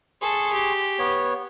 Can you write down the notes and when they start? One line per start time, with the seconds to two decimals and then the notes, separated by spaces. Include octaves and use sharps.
0.22 G#4 A4 C6 C#6
0.52 G4
0.99 B3 C#5